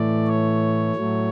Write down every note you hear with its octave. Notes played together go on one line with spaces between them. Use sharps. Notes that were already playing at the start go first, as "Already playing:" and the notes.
Already playing: A2 E3 A3 D5
C#5
A2 F#3 A3